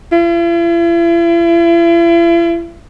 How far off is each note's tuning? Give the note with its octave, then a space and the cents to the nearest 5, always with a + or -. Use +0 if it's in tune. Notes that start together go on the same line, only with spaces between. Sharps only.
E4 +45